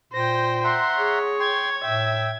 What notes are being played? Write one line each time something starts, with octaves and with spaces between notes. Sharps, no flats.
A#2 C5 G5 A#6
E5 F#5 A#5 C6
G#4 C#5
G5 C6 G#6
A2 E5 G5